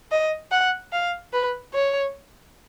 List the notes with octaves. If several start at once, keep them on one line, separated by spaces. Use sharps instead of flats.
D#5
F#5
F5
B4
C#5